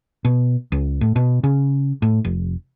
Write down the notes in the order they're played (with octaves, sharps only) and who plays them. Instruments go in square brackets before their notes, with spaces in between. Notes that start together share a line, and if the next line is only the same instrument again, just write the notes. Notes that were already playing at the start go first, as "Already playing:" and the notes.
[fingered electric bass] B2
C#2
A2
B2
C#3
A2
F1